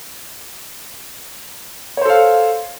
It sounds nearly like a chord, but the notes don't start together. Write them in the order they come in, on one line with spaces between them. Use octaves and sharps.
C#5 C5 A4 F5